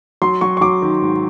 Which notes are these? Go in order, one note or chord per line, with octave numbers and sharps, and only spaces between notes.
F#3 C6
F#3 C#6
C#6
F#3 D6
D#3
G#2